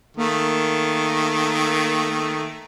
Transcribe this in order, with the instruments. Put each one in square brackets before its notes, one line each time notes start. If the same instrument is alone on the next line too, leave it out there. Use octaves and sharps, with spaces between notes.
[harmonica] D#3 A3 [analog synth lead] A#3